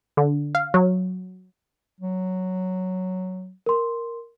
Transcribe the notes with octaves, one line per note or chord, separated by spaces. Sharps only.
D3
F5
F#3
F#3
A#4 C6